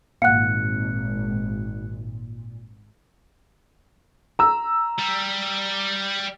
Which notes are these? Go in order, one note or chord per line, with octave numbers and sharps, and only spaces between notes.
G#1 A#2 F5 F#5 F#6 C#7
A#5 E6
G3